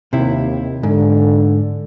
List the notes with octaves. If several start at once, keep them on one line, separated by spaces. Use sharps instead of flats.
D#2 C3 E4
G#2 D3